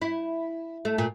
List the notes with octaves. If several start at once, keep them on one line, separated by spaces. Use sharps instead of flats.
E4
A3
A#2